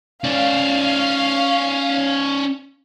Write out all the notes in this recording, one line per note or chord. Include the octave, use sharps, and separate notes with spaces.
C#4 D5 F5